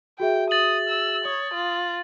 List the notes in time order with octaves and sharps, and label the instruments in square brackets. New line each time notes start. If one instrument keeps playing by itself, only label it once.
[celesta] F#4 G#4 E5 [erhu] G5
[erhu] D#6 [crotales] A6 F#7
[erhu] E6
[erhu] C#5 [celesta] D#6
[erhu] F4